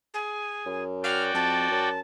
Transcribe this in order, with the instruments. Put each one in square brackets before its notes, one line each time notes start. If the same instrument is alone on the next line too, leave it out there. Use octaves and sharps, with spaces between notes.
[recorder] G#4
[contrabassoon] F#2
[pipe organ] F#4 D5 G5 [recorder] F6
[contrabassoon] F2 [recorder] A5
[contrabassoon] F#2